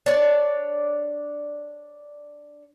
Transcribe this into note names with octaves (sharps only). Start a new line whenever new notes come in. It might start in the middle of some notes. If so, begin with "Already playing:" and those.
D4 C#5 D5